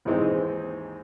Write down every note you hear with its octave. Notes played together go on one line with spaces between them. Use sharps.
D#2 G#2 E3 G#3 C4 D#4